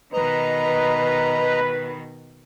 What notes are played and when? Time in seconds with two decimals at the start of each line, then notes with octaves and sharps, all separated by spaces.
0.13 B2 D#3 B4 D#5 A#5